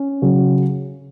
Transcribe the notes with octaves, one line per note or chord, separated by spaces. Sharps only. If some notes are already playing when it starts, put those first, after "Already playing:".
Already playing: C#4
C#3 F#3